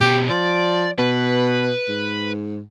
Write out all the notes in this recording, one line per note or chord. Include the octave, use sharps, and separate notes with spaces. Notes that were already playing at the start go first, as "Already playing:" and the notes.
B2 G3 G4
F3 D5
B2 B4
G#2